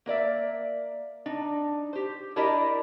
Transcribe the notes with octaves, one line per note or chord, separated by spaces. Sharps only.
A#3 A#4 D5 E5
D4 D#4
G4 C5
D4 E4 G4 A#4 D5 D#5